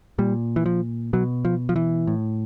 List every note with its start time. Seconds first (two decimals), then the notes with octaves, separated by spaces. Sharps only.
0.19 A#2 G3
0.56 E3
0.66 F3
1.13 B2 F#3
1.45 F3
1.69 F3
1.76 E3
2.07 A2